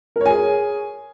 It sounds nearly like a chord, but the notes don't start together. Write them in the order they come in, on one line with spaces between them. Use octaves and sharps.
A#4 C#5 G#5 G#4